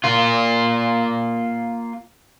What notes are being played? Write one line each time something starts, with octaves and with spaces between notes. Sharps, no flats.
A#3 F4